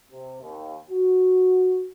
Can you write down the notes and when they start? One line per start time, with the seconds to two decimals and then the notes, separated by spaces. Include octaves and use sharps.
0.11 C3
0.42 D#2
0.90 F#4